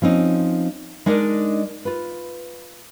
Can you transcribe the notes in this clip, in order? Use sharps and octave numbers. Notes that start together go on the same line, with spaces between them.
F3 C4 C#4 D#4
G#3 D4 D#4 A#4 D5
F4 B4